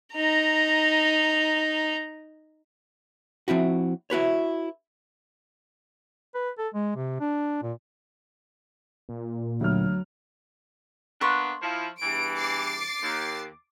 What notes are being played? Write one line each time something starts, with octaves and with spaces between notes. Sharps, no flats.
D#4 A#5
F3 C4 E4 F#4
E4 F#4 B4 C#5
B4
A4
G#3
C3
D4
A#2
A#2
D2 F#3 F6
A#3 B3 D4 C6 C#6
F3 E4
E2 G2 E3 D7
D6 A6 C7
D#2